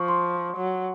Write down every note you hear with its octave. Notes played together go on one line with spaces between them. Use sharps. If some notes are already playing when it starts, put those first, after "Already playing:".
Already playing: F3 C#6
C6
F#3